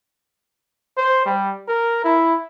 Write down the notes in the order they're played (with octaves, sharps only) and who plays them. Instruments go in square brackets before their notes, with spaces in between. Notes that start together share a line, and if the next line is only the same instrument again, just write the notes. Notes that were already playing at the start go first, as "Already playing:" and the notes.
[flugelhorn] C5
G3
A#4
E4